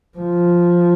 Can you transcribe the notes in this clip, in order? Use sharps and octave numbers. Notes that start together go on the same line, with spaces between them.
F3